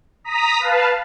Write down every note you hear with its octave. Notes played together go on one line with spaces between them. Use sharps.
A#5 D#6 B6
B4 F5 A5